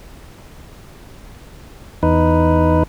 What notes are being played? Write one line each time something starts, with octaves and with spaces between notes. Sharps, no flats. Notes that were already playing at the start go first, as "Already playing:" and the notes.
E2 D#4 B4